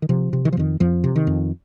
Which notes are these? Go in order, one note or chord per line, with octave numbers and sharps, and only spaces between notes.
D#3
C3 F3
C3
D#3
F3
F2 D#3
F2 F3
C3
D#3
F2